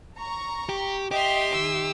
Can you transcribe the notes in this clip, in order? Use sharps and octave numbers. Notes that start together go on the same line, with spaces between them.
A#5 C#6
G4
G4 D#5 E5 G5 C6 F7
D#3 E6